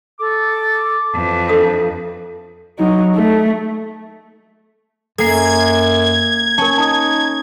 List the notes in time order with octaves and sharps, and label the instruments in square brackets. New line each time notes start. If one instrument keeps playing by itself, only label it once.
[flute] A4 [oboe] D6
[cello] F2 E3 [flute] A5
[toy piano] D4 A4 D#6
[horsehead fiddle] F#3 D#4
A3
[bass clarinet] F#2 [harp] A#3 G#5 C7 [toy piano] A4 [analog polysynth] G#6
[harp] C#4 [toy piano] A#4 A5
[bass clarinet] D#4 [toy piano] A5 D#6